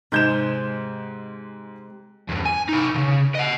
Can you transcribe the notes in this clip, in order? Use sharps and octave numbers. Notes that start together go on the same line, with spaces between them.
G#2 C3 G#3 G6 E7
E2 G2
G#5
D#4 B4
D2 C#3
D#5 F#5